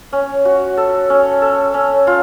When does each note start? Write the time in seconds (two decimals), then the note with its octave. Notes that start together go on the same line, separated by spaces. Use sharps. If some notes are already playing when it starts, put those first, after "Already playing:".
0.12 C#4
0.45 F#4
0.77 A4
1.10 C#4
1.42 A4
1.74 C#4
2.07 F4